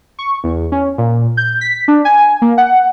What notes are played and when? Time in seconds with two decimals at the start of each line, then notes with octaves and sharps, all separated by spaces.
0.19 C#6
0.44 E2
0.72 C#4
0.98 A#2
1.37 G6
1.61 B6
1.88 D4
2.05 G#5
2.42 A#3
2.58 F#5